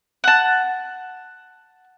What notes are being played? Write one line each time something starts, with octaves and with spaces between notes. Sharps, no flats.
F#5 A5